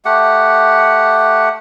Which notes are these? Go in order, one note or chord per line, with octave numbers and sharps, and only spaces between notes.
A3 G4 F#5